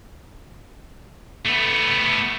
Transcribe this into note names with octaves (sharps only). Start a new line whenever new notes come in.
A3 B3